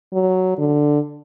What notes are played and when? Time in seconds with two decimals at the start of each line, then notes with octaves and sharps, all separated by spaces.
0.13 F#3
0.58 D3